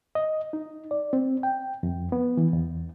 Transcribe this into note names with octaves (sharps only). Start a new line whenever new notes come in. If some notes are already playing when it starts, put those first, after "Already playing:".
D#5
D#4
D5
C4
G5
F2
B3
E3
E2